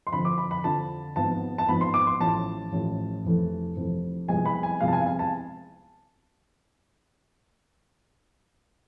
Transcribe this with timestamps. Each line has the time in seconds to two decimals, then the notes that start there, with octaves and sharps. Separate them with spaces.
0.07 C6
0.12 F2 D3 F3 B5
0.25 D6
0.38 B5
0.51 B5
0.64 F2 D3 F3 A5
1.16 G#1 G#2 F3 B3 A5
1.58 A5
1.68 G#1 G#2 F3 B3 B5
1.81 C6
1.94 D6
2.07 C6
2.20 A1 A2 F3 A5
2.72 A1 A2 F3
3.24 F1 F2 E3 A3
3.76 F1 F2 E3 A3
4.28 C2 C3 F3 G#3 B3 G#5
4.45 B5
4.63 G#5
4.81 C2 C3 F3 G#3 B3 F5
4.88 A5
4.93 G#5
5.01 F5
5.06 G#5
5.19 A5